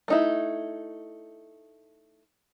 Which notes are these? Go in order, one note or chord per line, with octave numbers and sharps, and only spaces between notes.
A3 D#4 E4